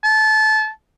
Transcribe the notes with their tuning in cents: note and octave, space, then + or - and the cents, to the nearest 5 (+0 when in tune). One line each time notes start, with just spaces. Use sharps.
A5 -25